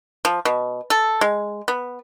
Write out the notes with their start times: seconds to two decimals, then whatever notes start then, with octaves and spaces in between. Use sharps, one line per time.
0.25 F3
0.45 B2
0.90 A4
1.21 G#3
1.68 B3